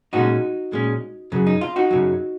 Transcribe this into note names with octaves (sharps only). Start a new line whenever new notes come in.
A#2 G#3 C#4 D#4 F#4
A#2 G#3 C#4
F#2 C#3 F#3
D#4
F4
D#4 F#4
F#2 C#3 F#3